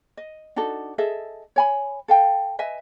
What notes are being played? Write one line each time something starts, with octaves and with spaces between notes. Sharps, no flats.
D#5
D4 D#4 F#4 A4
G#4 A4 D#5 E5
C#5 G#5 B5
A4 F5 G5
B4 D#5 E5 G#5